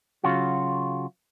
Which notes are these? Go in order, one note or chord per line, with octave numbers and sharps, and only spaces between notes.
C#3 F#3 F4 F#4